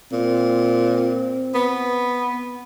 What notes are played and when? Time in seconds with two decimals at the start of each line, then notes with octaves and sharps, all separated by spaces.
0.12 A#2 C4
1.55 B3